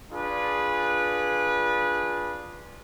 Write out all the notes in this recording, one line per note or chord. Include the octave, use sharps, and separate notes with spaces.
D4 F4 G#4 B4